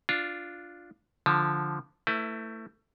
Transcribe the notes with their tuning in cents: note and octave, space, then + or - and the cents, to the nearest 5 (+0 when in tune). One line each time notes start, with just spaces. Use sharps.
D4 +0 F4 +0
D3 +0 F3 +0
A3 +25 E4 +0 B4 +30